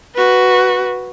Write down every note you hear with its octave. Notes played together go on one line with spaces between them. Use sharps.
F#4 B4